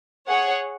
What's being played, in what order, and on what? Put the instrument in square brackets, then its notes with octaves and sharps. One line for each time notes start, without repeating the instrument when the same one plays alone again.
[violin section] G#4 C#5 F#5